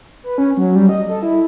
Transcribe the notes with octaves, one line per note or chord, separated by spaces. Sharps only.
B4
C#4
F#3
G3
D#5
A4
E4